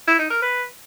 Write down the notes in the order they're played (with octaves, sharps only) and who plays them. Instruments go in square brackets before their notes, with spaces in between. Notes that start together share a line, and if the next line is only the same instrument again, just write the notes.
[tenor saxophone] E4
D#4
A#4
B4